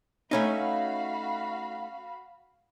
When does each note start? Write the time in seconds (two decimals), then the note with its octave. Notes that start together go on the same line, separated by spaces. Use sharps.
0.31 A3 C#4 D#4 F#4 F5 B5